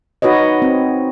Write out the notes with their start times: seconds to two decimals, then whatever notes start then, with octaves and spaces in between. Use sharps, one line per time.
0.22 D#4 F#4 B4 C#5 D#5
0.62 C4